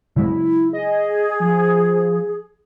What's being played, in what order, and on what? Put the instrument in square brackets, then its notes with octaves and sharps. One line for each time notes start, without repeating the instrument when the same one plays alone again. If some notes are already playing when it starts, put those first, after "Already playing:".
[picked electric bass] C#3 F#3 G#3 [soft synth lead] E4
[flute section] G#4 [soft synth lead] D#5
[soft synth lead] F3